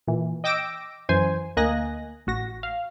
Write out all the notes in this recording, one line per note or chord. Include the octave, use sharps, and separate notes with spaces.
A#2 E3
D#5 G5 D6 E6 A#6 D7
F#2 E3 C5 G#5
D2 A#3 D#5 G#5 F#6 A#6
A1 F#4 A#6
F5